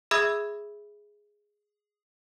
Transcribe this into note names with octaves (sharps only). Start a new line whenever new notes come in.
G#4 E5 B5 D#6 E6 G#6